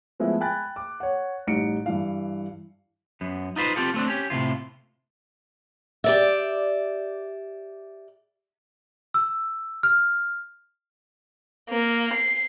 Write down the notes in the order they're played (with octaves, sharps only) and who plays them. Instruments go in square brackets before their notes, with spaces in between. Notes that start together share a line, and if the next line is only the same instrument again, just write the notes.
[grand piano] F3 G#3 A3 B3 E4
G5 G#5 B5 F#6 A6
D6
C#5 F#5
A1 G3 D#4 C#7 D7
G2 E3 F5
[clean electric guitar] F#2 B3
D#4 F4 B4 C5
C4 F4 G4 A4
A3 C4 D4
C#4 G4
A2 C3 D#3 F4
[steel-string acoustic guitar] G4 D5 E5
[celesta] E6
F6
[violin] A#3
C7